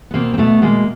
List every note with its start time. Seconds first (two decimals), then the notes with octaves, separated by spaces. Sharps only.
0.11 B3
0.14 B2 A#3 C4
0.34 C4
0.38 B2 A3 B3
0.62 B2 G#3 A#3